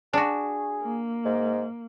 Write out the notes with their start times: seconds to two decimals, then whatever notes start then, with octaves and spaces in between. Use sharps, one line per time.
0.13 D4 F#4 G#4
0.82 A#3
1.25 G#2